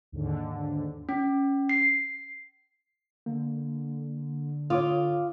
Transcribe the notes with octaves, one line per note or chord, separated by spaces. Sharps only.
D#2 G#2 D3
C#4
C7
D3 A#3
F4 C#5 D6 D#6